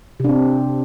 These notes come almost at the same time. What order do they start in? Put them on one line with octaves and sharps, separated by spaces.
C3 D4 C4